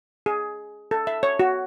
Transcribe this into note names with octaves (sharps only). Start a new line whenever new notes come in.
G#4
A4
E5
C#5
F#4